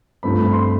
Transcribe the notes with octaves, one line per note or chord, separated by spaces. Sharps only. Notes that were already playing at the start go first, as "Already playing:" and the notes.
G2 F3 A3 C4 B5
B5
C6